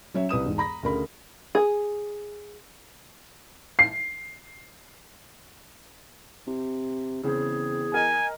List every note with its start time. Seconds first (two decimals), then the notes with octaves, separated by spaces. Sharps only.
0.14 F#3 C#4 C#5 E5
0.29 C2 B4 D#6 E7
0.45 E1 G#2
0.58 A#5 B5 A#6
0.83 D2 C#3 A#4 B5
1.55 G#4
3.79 C7
6.47 C3
7.24 E2 C#3 C4 G#4 C5
7.94 A#4 D#5 G#5 A#5